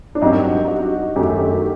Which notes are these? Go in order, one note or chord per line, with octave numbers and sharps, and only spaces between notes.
D4
G2 F#3 C4 D#4 G4 A#4
F#4
F#2 D#3 A3 G4